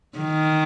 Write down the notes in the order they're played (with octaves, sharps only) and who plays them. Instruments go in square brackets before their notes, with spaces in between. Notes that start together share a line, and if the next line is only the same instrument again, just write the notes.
[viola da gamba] D#3